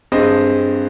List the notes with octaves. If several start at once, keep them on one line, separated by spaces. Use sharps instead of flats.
G2 C4 G#4 D#5